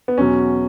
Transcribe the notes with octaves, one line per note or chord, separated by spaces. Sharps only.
B3
E2 B2 F#3 C#4